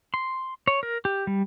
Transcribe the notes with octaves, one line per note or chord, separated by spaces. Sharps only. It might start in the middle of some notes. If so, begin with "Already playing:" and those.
C6
C#5
A#4
G4
G3